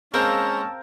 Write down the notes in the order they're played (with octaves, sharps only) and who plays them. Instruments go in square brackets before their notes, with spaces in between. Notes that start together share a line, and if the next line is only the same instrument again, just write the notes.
[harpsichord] G#3 A#3 C5 [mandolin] C4 A#4 F5 [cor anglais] C#4 [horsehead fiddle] A5